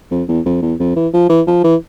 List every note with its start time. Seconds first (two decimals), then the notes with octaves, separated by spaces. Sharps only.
0.11 F2
0.28 E2
0.46 F2
0.62 E2
0.80 F2
0.96 E3
1.13 F3
1.30 E3
1.47 F3
1.64 E3